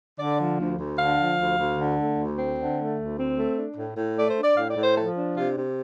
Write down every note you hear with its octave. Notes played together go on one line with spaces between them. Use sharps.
D3 D5
F3
D2
D2
D3 F5
F3
D2
D2
D3
A3
D2
C4
D3
A3
D2
C4
A3
D4
A2
A2
A3 D5
C5
D4 D5
A2 F5
D5
A2
C5
F3 A4
D4
C3 F4
C3